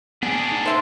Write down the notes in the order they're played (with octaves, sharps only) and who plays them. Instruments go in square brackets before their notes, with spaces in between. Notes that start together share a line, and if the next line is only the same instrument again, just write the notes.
[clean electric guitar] B3 G#5 [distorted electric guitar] D4 G#4
[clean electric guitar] D#4
[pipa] C5 E5 C6